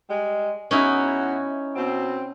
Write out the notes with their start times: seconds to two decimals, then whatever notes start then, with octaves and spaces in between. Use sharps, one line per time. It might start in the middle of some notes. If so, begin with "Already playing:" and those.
0.07 G3 G#3
0.71 E2 C#4 D#4 E4 F#4
1.75 B2 C4